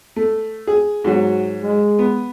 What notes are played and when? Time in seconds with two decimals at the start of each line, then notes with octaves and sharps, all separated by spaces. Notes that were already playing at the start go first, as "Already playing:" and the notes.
0.16 A3
0.67 G#4
1.04 G#2 F#3 F#4
1.62 G#3
1.99 B3